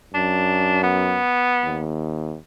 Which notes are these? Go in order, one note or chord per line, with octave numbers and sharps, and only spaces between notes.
F#2 D4
B3
D#2